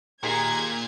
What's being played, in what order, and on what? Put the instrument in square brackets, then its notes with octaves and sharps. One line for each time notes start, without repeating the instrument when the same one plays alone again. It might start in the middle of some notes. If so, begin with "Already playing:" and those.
[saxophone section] D#2 D#3 G#4 [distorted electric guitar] A#2 [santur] A#5 [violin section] G#6